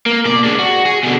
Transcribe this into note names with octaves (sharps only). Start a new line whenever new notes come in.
A#3
B2 D5
G#3 D4
F#4
G#4
B2 D3